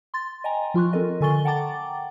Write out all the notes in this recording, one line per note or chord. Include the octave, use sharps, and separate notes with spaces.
C6 A6
D#5 G5 G#5 A#5
F3 F4 C6 C#6 F#6
C4 A4 A#4 D#5
D3 A4 G#5 C#6 A6 G7
F#5 G5 A5 A#5 D6 A6